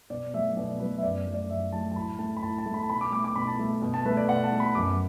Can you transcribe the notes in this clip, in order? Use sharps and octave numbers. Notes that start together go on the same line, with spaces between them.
B2 D5
F#3 A3 E5
B2 D5
F#3 A3 B4
E5
F#2 D5
F#3 A3
D5
F#2 E5
F#3 A3 A5
A5
A2 B5
A3 A5
B5
A2 A5
A5
A3
B5
A5
B2 B5
D6
A3 D6
D6
B2 B5
A5
A3
B2
A5
A3 B4
D5
B2 F#5
A5
A3
B5
F#2 D6